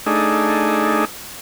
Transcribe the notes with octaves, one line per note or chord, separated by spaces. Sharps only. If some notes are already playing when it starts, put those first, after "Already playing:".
A3 D4 D#4 G#4